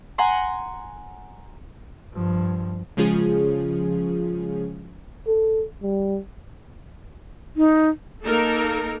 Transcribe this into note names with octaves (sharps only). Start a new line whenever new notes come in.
F#5 G#5 A#5 C6
G2 F3
C#3 F3 G#3 C#4 F4 G#4
A4
G3
D#4
A#3 D#4 A4 A#4